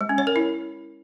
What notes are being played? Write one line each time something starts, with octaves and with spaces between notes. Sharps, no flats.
G#3
C#4
C#5
A#4
E4